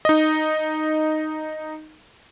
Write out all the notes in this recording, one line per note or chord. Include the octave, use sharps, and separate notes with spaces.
D#4 D#5